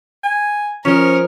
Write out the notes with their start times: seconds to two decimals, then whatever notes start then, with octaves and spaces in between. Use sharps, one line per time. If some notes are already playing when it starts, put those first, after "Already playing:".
0.24 G#5
0.85 F3 C#4 A#4 D#5